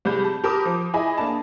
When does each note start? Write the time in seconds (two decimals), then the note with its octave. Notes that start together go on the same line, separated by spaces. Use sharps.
0.05 C2 G3 G#3 B5 G6
0.24 A5
0.44 G4 A#4 A5 B5 D6 D#6
0.65 F3
0.94 E4 G#4 D#5 G#5 B5
1.17 A#3 D4 A5